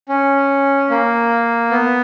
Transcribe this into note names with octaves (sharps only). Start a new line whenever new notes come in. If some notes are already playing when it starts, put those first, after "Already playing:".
C#4
A#3
B3